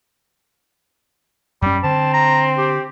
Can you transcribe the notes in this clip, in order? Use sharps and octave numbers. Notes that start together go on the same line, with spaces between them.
F#2 G3 C#4
D3 C4 A5
A#5
G4